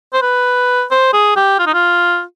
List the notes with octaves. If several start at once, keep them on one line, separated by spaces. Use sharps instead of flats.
C5
B4
C5
G#4
G4
F4
D#4
F4